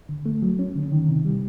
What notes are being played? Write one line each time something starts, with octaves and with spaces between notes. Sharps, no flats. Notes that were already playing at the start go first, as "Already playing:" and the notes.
D3
A3
F#3
C#4
D3
D#3
C3
G3